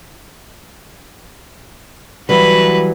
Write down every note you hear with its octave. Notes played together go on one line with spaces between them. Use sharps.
E3 F#3 G3 F#4 B4